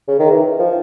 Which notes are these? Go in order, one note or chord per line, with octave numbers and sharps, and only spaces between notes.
C#3
D#3
E3
F3